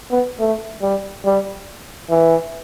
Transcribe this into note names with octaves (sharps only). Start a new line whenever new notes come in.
B3
A3
G3
G3
E3